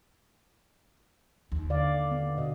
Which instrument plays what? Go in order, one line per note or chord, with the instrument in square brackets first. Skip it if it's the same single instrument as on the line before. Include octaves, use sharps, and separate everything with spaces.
[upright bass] D#2
[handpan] D3 D5 F5
B3
B2 D#5